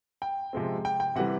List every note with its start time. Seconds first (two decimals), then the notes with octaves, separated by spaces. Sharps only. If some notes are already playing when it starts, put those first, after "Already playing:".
0.22 G5
0.53 C3 F3 G#3 C4
0.85 G5
1.00 G5
1.16 C3 E3 G3 F#5